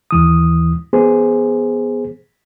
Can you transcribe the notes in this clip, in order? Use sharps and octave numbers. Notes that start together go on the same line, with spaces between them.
D#2 E3 D#6
B3 G#4 C5